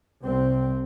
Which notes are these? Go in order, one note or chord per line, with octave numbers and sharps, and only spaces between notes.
C2 C4